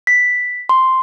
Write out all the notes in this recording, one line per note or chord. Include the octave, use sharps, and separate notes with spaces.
B6
C6